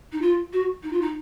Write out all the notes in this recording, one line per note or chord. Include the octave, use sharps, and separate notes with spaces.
D#4
F4
F#4
D#4
F4
D#4